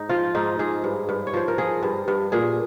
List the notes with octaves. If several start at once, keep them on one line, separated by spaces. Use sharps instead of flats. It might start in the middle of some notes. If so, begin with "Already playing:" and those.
Already playing: G#2 D#4
F3 F4
G#2 D#4
G#2 G#4
G2
G2
C#5
F3 C5
A#4
F3 G#4
G2
G2
A#2 G#4